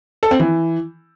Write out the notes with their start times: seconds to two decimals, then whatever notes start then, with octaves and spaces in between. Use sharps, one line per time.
0.23 A4
0.31 C4
0.39 E3